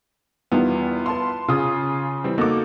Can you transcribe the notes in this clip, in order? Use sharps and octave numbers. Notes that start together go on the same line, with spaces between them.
E2 D#3 G3 B3 E4 F4
B4 A5 C6
C#3 F4 G#4 D#6
E3 G3 C4
A#3 D#4 F#4 A4 D6